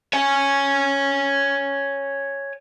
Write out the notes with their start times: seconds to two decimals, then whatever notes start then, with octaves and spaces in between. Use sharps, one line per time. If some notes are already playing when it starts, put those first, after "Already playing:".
0.13 C#5 G#5